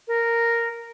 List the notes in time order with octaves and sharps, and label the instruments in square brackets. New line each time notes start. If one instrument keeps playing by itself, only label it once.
[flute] A#4